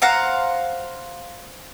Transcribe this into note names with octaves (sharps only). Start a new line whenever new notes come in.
C5 F5 F#5 A#5